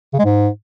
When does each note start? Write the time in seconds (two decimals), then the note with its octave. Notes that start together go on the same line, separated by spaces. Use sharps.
0.14 C#3
0.19 G#3
0.25 G#2